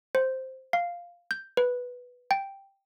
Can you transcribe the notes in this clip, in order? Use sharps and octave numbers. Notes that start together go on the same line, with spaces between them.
C5
F5
G6
B4
G5